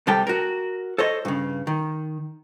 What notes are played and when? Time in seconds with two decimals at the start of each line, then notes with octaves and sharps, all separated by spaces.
0.07 C2 C3 G3 A4 G5
0.27 F#4 A#4
0.98 A4 C5 C#5 D#5
1.25 G2 C#3
1.67 D#3